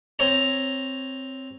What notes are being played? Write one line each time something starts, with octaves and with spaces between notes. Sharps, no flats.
C4 C#5 A#5